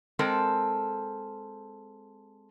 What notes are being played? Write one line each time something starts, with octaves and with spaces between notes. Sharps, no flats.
G#3 C4 A4 A#4